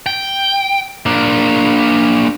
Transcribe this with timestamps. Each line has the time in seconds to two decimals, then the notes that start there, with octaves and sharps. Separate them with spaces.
0.06 G5
1.06 A#3 D4